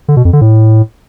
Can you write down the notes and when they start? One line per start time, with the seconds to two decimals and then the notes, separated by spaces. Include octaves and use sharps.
0.08 D3
0.17 B2
0.25 F2
0.33 D3
0.41 A2